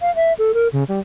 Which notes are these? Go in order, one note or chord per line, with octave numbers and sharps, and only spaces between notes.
F5
E5
A4
A#4
C#3
G3